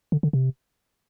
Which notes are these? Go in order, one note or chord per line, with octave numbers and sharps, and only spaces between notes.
D3
D3
C3